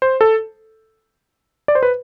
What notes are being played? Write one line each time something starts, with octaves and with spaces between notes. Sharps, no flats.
C5
A4
D5
C5
B4